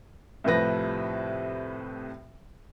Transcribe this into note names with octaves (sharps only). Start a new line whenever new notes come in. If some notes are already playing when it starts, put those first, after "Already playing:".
C2 A2 C3 F3 B4 A#6